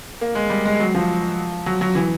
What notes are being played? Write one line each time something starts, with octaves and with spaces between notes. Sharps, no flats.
A#3
G#3
G3
G#3
F#3
F3
F#3
F#3
E3